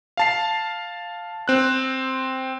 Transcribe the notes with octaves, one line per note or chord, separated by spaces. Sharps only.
F5 A5 C7
C4 F#6